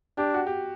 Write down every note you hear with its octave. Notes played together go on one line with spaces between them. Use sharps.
D4 G4
F#4
G4